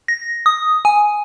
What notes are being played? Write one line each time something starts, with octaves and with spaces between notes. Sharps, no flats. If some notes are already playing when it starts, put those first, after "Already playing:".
A#6
D#6
G#5